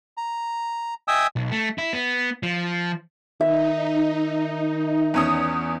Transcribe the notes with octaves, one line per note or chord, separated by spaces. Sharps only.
A#5
D#5 E5 G5 G#5 D#6 E6
B1
A3
E4
B3
F3
D#3 D#4 E5
E2 C#4 D#6